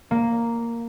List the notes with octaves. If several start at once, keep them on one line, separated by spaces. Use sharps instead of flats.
A#3